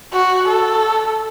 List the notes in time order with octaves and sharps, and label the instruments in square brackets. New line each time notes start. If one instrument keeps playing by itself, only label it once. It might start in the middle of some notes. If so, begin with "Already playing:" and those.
[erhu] F#4
A4